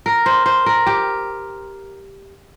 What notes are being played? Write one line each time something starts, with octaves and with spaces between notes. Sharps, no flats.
A#4
C5
C5
A#4
G4